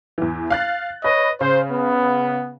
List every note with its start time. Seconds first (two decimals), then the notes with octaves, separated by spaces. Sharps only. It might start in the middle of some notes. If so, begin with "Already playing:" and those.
0.18 E2 E3
0.50 F5 F#6 A6
1.04 B4 C#5 D#5
1.41 C#3 C5
1.72 B3